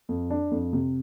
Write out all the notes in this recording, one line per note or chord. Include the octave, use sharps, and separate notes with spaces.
F2
D4
F2
C3